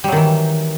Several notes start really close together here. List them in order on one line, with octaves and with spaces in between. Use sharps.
G3 F#3 D#3 E3